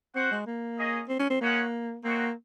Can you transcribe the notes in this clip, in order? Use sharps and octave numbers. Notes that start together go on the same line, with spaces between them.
C4 F#4 C5 F#5
G#3
A#3
C#4 G#4 D#5
C4
C#4
C4
G#3 A#3 C#4 F#4 C#5 F#5
A#3 C4 D#4 F#4 C#5